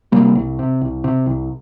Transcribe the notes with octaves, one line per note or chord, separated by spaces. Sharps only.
C3 G3 A#3
C2
C3
C2
C3
C2